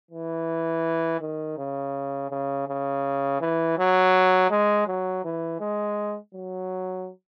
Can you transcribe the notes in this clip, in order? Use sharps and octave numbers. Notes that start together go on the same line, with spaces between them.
E3
D#3
C#3
C#3
C#3
E3
F#3
G#3
F#3
E3
G#3
F#3